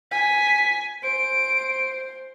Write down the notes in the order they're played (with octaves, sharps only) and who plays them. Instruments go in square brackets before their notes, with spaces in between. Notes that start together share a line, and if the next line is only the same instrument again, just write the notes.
[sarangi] G#5 [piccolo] B6
[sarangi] C5 [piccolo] D7